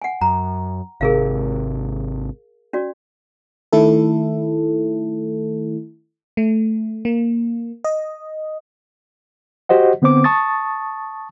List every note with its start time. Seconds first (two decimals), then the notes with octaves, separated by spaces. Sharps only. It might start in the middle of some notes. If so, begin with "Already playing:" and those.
0.02 F#5 G#5
0.21 F#2 A#5
1.01 G#1 C3 G#4 A#4 F5
2.73 C#4 F#4 D5
3.73 D#3 A3 E4 A4
6.37 A3
7.05 A#3
7.84 D#5
9.69 F#4 G4 C5 D#5 F#5
10.02 D3 B3 C4 C5 D6
10.24 A5 C#6 D#6 A6